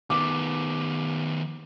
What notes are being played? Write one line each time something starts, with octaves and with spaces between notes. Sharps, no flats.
D#3 B3 D6